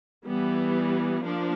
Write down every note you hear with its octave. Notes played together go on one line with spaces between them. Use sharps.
E3 G3 B3
F3 A#3 D4